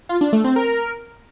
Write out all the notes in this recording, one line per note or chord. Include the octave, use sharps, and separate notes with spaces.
F4
D4
A3
C4
A#4